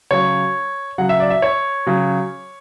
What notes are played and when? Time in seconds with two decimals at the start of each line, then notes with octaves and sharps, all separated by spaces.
0.11 C#3 F#3 C#5
0.98 C#3 F#3 F#5
1.09 E5
1.20 D5
1.30 E5
1.42 C#5
1.87 C#3 F#3